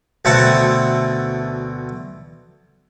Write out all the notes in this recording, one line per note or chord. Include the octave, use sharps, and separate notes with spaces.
D2 B2 A3 C4 F#5 A5